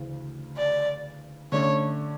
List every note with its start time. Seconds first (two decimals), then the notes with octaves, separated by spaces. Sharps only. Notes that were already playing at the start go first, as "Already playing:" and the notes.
Already playing: D2 C#3 E3
0.57 D5
1.52 D3 A3 C#4 C#5